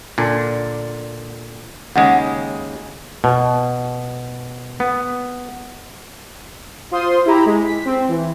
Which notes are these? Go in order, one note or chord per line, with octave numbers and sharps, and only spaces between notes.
A#2 D3 D4
D#2 C#3 G#3 F#5
B2
B3
F4 C5 C6 D#6
E4 G4 A#5 B5
G#3
B6
C4
E3